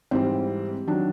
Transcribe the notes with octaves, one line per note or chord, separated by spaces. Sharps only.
G#2 E3 G3 C4
D#3 F#3 D4